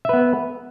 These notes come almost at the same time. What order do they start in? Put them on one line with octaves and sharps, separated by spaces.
E5 B4 B3